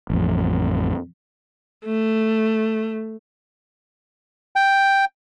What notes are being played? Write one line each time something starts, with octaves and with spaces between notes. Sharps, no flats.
A1 F2
A3
G5